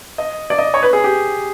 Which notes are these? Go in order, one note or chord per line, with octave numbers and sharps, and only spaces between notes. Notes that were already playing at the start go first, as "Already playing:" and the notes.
D#5
D5
D#5
C#5
B4
G#4
G4